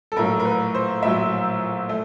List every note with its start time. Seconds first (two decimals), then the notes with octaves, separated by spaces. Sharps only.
0.12 A4
0.16 A#1 A2 F#3 A#4
0.40 A#4
0.45 B4
0.75 C5
1.03 A#1 A2 F#3 E5
1.89 A3